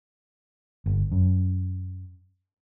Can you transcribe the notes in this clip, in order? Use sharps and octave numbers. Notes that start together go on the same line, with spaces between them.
G1
F#2